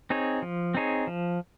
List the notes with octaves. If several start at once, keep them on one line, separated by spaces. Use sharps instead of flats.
C4 D#4 G#4 C#5
F3
C4 D#4 G#4 C#5
F3